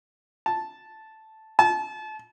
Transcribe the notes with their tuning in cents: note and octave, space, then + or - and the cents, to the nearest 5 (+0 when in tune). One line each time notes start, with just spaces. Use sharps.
A5 -5
A5 -30